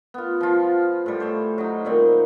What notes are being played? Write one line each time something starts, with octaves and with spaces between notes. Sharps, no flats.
B3 F4
F3 F4
A2 G3
C5 C#5 E5
F#3 D#4
A#2 D#3 G3 C4